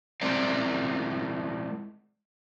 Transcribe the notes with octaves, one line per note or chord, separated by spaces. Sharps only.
G#3 C4 E4 A#4 C5 D5